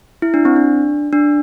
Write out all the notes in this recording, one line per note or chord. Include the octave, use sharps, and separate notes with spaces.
E4
D4
C4
D4
D4